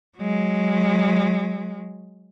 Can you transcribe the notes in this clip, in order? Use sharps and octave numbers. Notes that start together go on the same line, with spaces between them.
F#3 G#3